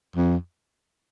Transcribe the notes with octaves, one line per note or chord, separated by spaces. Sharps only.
F2